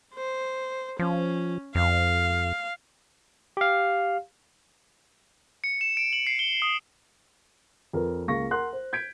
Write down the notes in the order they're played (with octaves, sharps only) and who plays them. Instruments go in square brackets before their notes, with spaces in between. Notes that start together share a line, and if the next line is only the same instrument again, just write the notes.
[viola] C5
[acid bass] F3 [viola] C#4
[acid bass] F2 [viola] F5
[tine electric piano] G4 F5
[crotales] C#7
E7
D7
F#7
C7
G7
D#6
[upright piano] F2 A#4 B4
C#2 A#3 F5 C#6 A#6
A#4 F#5 C6 F#6
C5
G6 G#6 B6 D7